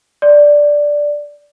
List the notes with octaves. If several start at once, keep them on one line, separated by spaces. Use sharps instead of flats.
D5